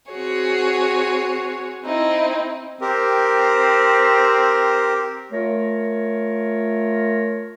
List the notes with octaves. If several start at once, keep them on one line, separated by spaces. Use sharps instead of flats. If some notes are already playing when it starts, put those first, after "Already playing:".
C4 F#4 G#4 C#5
C4 D#4 E4
C4 G4 A#4
A3 F4 A#4 C#5